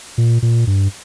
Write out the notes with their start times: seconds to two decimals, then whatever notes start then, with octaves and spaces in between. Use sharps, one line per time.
0.18 A#2
0.42 A#2
0.67 G2